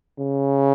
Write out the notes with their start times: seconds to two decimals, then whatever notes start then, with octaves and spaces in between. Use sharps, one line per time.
0.19 C#3